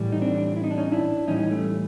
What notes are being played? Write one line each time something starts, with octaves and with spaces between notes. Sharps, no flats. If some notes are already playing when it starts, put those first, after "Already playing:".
Already playing: A2 E3 G3
D#4
C4 D4
E4
D#4
D4
C#4 D#4
D4 E4
A2 E3 G3 C#4 D#4
A3